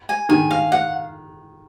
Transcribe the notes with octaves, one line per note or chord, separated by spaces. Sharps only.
G#5
D#3 G#5
F5
F#5